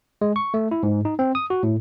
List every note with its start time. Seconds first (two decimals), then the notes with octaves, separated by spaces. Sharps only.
0.21 G#3
0.36 C#6
0.54 A3
0.71 E4
0.83 G#2
1.05 D#4
1.19 C4
1.35 D#6
1.50 F#4
1.63 A2